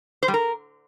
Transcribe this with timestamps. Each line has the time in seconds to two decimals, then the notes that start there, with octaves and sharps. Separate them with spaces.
0.23 C5
0.28 G3
0.34 A#4